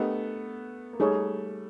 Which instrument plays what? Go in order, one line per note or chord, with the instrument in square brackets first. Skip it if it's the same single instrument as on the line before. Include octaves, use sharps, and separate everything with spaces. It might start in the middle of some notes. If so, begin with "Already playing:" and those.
Already playing: [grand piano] A3 B3 [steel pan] D4 G4 A#4 D#5
[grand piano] A#3
[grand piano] G3 A3 [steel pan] D#4 G#4 C#5